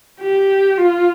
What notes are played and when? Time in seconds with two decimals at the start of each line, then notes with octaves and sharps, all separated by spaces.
0.21 G4
0.77 F4